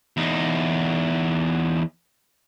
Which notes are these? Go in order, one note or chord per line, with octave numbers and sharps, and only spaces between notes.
E2 D#4